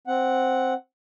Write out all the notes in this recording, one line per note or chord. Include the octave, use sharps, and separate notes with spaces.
C4 F#5